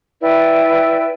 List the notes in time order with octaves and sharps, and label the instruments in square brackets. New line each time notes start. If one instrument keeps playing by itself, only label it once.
[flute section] E4 B4 D5 G5